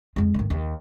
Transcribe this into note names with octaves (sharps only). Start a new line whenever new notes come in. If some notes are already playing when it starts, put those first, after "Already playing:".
F2 G#3
G#1 D2
D#2